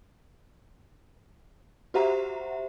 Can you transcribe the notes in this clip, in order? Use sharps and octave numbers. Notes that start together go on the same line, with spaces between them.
F#4 G4 C5 E5 F#5 A#5